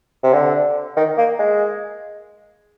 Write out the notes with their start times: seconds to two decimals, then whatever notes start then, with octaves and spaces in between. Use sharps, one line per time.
0.23 C3
0.33 D3
0.96 D#3
1.17 A#3
1.39 G#3